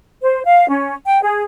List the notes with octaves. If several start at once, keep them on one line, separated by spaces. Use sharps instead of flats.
C5
F5
C#4
G5
G#4